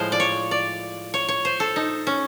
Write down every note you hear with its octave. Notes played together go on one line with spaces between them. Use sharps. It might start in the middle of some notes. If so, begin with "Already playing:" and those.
Already playing: A2 F3 G#3 C5
D5
C#5
D5
C#5
C#5
C5
A4
D#4
C#4